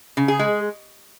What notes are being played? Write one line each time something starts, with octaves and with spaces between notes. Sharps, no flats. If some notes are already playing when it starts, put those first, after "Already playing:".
C#3
G#4
G#3